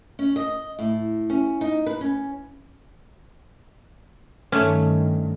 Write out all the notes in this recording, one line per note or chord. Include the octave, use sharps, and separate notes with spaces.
C#4
D#5
A2
C#4
D#4
B4
C#4
G2 D#3 A3 C#4